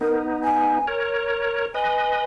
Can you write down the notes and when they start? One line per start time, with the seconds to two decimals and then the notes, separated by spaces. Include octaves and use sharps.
0.01 B3 D#4 A#4
0.44 G#5
0.87 A#4 C#5
1.74 B4 D#5 G#5